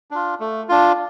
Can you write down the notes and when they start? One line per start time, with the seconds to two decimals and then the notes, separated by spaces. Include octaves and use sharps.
0.11 D4 F4
0.40 A3
0.69 D4 F4